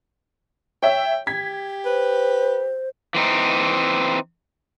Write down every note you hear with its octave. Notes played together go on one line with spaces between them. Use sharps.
C#5 E5 G5
G4 G#6 B6
B4 C5
E3 C4 D#4